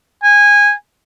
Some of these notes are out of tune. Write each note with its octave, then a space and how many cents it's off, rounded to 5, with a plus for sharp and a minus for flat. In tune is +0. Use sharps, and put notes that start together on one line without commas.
G#5 -15